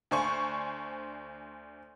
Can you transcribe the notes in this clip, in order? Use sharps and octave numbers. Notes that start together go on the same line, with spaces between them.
D2 D4 C5 G#5 C#6